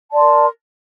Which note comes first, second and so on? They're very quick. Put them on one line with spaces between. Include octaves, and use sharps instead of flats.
A5 D5 C6 A#4